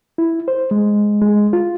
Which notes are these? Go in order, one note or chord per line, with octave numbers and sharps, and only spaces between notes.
E4
C5
G#3
G#3
F4